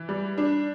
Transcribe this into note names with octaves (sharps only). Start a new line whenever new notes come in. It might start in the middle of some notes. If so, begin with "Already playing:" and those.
Already playing: E3
G3
D4